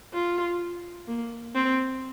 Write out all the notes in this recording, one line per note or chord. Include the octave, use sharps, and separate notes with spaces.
F4
A#3
C4